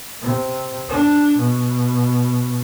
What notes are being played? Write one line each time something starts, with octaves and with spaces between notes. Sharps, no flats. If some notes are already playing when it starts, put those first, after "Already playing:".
C3
D4
B2